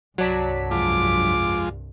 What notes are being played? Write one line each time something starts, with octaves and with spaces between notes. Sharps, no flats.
C2 G2 F#3 D4 B6
F2 G#3 F4 D6